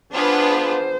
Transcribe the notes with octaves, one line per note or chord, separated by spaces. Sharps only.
B3 D4 F4 G#4 B4 C5